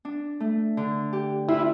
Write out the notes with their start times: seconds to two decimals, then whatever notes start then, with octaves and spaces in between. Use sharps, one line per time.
0.05 D4
0.40 A3
0.77 D3
1.13 G4
1.49 E4 F4